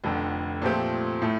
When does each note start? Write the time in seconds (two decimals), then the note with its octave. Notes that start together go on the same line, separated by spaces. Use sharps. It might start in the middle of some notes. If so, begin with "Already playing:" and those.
0.04 F1 F2 D3
0.62 A#2 F3 A3 C4 G4
1.22 A2 A3